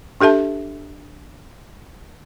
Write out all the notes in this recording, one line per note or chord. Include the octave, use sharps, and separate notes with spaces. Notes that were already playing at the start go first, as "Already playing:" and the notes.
D4 G4 A4 E5 A5